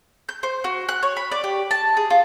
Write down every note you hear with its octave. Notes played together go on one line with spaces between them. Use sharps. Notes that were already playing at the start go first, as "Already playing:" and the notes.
G6
C5
F#4
F#6
C#5
B5
D5
G4
A5
G#4
F4